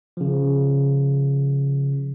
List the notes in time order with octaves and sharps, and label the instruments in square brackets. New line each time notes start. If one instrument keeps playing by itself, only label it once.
[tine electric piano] C#3 F3